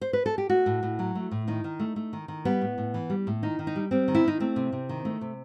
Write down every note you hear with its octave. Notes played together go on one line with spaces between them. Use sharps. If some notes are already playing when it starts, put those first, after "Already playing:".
C5
B4
A4
G4
A3 F#4
A2
A2
F#3
A3
A2
D#3 D#4
D#3
A3
A3
D#3
D#3
G3 B3
A2
A2
E3
G3
A2
D#3 D#4
D#3
D#4
G3
G3 C4
D#3
E4
D#3 D#4
A3 C4
C3
C3
D#3
A3
C3